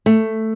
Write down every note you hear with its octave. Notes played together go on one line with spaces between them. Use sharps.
A3